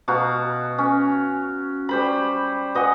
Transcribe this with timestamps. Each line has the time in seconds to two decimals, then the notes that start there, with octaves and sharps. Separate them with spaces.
0.08 B2 F#4 F5 A#5
0.78 C#4
1.89 G3 C5 B5
2.75 B4 D#5 F#5 G#5